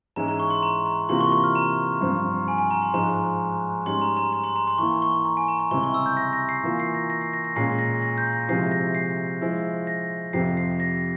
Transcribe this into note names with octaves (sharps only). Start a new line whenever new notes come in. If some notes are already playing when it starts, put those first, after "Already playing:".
G#2 E3 G#3 C#4 E4 A#5
A#5
C#6
C6
A#5
A#5
C3 E3 A#3 F4 C6
C#6
C#6
F6
A#5
G2 F3 C4
G#5
G#5
A#5
C6
G#2 F3 G#3 A#5
G#2 G3 C#4 C6
A#5
A#5
A#5
C6
A#5
C6
E3 A#3 E4 C#6
C#6
A#5
G#5
A#5
A#5
C#2 C3 G3 C4 E4 C#6
C#6
E6
G6
A#6
A#6
C7
E3 A#3 F4
C7
A#6
A#6
C7
A#6
A#6
A#2 G#3 C#4 C7
A#6
A#6
G6
A#6
C3 F3 G#3 E4 C7
A#6
C7
F3 G#3 E4
A#6
F2 C3 F3 C4 G4 C7
C7
A#6